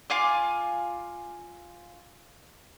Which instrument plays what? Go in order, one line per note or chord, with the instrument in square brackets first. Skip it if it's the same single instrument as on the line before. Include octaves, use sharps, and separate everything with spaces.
[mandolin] F4 F5 G#5 D6